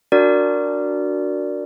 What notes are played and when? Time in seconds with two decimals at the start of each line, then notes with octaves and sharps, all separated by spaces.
0.12 D4 F#4 A#4 D5